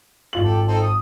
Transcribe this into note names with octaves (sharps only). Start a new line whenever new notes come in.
G#1 F4 F#7
G4 A4
C4 D#4 A4
D#6